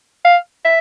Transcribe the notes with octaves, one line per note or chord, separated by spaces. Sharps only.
F5
E5